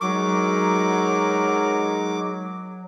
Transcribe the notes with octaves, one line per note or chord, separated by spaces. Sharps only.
F#3 G#3 D#4 A#4 C#6 D6